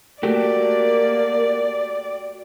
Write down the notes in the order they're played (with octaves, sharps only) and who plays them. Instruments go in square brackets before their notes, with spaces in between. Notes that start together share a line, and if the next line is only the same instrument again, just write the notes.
[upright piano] A3 [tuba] A#3 [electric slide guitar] F#4 G4 [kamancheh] D5